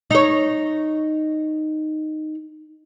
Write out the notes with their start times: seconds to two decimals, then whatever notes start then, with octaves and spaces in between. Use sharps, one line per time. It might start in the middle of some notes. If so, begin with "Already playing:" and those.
0.11 D#4 C#5